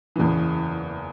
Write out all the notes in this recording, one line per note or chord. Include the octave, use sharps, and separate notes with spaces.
F#1 E2 C#3 E3